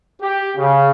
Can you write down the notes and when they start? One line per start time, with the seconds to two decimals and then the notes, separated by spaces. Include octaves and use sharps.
0.21 G4
0.57 C#3